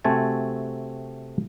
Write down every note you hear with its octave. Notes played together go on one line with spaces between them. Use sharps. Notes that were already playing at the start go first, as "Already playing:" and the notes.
C3 A3 C4 F#4 G#5 A5